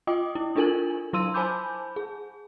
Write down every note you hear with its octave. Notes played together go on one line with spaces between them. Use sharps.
F4 D#5 G5 D6 D#6
E4
D4 F4 A4 A#4 G#5 F#7
F#3 E4 C6 E6 D#7
C5 G#5 A5 B5 D6 G6
G#4